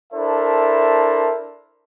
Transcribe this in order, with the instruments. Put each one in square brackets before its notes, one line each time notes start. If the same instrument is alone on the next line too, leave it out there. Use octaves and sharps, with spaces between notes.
[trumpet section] D4 E4 A4 A#4 C5 E5